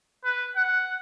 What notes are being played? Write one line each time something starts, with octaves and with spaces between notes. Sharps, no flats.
B4
F#5